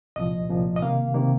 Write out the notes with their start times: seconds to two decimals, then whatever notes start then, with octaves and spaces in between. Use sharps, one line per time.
0.16 C2 A#2 F3 D#5
0.50 C2 A#2 F3
0.76 D#5
0.82 C3 D#3 A#3 F5
1.14 C3 D#3 A#3